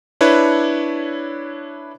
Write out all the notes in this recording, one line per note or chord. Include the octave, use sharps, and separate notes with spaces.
D4 E4 B4 C#5